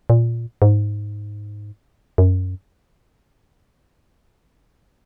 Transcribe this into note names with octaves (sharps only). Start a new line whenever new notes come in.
A#2
G#2
F#2